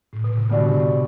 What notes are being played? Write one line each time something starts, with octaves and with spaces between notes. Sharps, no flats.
A2
B2
C3
B2 D3 G3 D4 F#4
C3